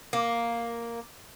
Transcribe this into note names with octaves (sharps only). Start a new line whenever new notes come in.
A#3